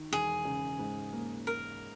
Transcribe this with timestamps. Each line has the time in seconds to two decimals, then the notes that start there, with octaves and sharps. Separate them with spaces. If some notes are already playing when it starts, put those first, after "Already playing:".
Already playing: D#3
0.12 E1 G#4
0.45 C#3
0.79 G#2
1.13 A#3
1.47 A#4